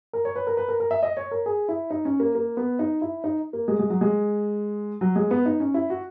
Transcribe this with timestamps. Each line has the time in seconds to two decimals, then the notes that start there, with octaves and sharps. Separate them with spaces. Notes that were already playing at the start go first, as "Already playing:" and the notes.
0.13 A#4
0.25 C#5
0.36 B4
0.47 A#4
0.57 B4
0.69 A#4
0.80 A#4
0.91 E5
1.03 D#5
1.17 C#5
1.31 A#4
1.46 G#4
1.69 E4
1.90 D#4
2.05 C#4
2.20 A#3
2.35 A#3
2.57 B3
2.79 D#4
3.02 E4
3.24 D#4
3.53 A#3
3.68 G#3
3.79 G#3
3.90 F#3
4.01 G#3
5.01 F#3
5.16 G#3
5.31 B3
5.46 D#4
5.60 C#4
5.74 E4
5.90 F#4